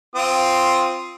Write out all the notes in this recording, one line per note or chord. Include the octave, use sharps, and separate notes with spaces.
C4 F4 D#6